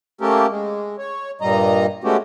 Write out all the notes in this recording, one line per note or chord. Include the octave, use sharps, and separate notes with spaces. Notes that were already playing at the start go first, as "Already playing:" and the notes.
A3 A#3 C#4 G4 A4 A#4
G#3
C#5
G2 A#2 G3 D#5 A#5
G#3 A3 B3 C#4 F#4 G4